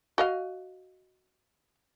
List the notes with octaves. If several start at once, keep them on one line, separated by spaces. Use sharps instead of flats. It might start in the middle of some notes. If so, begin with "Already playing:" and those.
F#4 D#5 F5